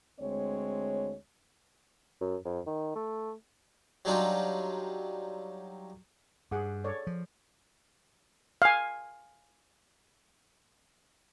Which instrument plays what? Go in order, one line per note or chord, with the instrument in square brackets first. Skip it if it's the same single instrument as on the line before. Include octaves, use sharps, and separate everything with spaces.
[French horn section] D2 G#3 C4 C#5
[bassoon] F#2
F2
D#3
A3
[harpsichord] F#3 G3 D4 D#4 F4
[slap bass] G2 [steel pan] G#4 F#5 D6
[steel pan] A4 C#5 D5
[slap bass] F3
[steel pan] F5 G#5